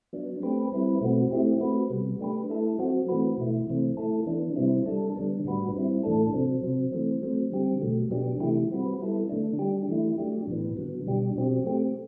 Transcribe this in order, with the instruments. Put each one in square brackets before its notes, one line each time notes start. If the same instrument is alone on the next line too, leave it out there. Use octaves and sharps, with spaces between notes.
[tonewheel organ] F#3 B3 D4
A3 C4 G4 B4
G3 C4 E4 B4
B2 A3 C4 F#4
A3 C4 E4 G4
A3 C4 F#4 B4
C3 G3 B3
A3 D4 G4 B4
A3 E4 A4
F#3 C4 F#4
E3 A3 C4 F#4 B4
B2 A3 E4
C3 E3 A3 C4
A3 E4 A4
E3 B3 D4
C3 G3 C4 E4
G3 D4 A4
D3 G3 B3 D4
A2 G3 D4 F#4 B4
G3 C4 E4
A2 E3 A3 D4 A4
C3 F#3 C4
C3 F#3 C4
E3 A3 C4
F#3 A3 C4
D3 G3 C4 G4
B2 F#3 A3
B2 F#3 B3 D4 G4
C3 E3 A3 E4 G4
G3 C4 F#4 B4
G3 B3 E4 A4
D3 A3 D4
G3 D4 G4
E3 A3 E4
F#3 A3 D4 G4
A2 E3 B3
D3 F#3 B3
B2 G3 D4 G4
B2 F#3 C4 G4
A3 C4 G4